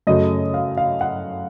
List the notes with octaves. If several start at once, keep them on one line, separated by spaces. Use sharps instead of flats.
F#2 C#3 F#3 A3 D#5
F5
F5
F#5